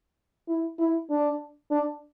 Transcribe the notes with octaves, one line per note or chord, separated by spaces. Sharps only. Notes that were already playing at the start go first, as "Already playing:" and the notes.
E4
E4
D4
D4